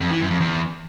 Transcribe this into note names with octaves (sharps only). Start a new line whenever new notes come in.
F2
E3
F#2
F2
E2